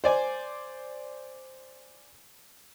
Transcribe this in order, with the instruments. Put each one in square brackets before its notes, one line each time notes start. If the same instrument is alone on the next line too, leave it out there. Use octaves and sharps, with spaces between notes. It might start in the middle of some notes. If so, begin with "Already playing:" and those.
[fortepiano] C5 D5 G#5